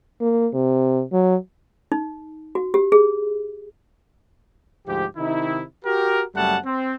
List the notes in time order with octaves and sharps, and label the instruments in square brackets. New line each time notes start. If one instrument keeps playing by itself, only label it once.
[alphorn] A#3
C3
F#3
[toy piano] D#4
F#4
G4
G#4
[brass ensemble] D2 G#2 F3 G4
C3 D#3 D#4 E4
F#4 G4 A#4
F#1 F#2 G3 A3 F#5 A5
C4